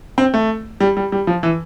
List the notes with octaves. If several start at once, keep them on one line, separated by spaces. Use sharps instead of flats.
C4
A3
G3
G3
G3
F3
E3